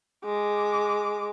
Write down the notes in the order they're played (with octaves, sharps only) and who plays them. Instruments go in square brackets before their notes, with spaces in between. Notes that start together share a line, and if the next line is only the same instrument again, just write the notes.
[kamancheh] G#3 D6